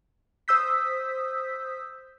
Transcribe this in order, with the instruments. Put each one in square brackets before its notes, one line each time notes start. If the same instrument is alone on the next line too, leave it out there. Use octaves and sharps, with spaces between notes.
[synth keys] C5 D#6 E6 G6 B6